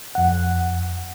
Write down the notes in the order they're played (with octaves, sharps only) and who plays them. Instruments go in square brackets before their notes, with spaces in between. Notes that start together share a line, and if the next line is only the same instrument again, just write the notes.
[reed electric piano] F2 F#5